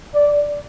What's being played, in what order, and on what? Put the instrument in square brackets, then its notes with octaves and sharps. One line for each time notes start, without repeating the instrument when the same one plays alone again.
[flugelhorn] D5